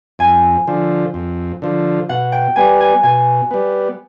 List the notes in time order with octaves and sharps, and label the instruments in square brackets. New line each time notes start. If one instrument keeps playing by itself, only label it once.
[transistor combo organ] F2 [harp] G#5
[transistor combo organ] D3 F3
F2
D3 F3
[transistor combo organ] B2 [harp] F#5
[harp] G5
[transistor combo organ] G3 B3 [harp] G#5
[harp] G#5
[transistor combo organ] B2 [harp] G#5
[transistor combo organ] G3 B3